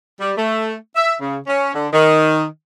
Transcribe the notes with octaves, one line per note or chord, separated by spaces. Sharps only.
G3
A3
E5
C#3
C#4
D3
D#3